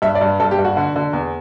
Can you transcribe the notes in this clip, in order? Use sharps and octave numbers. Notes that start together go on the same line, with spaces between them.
G2 E5
D5
G2
G2 A4
G4
G2
F#4
D3
D3
E2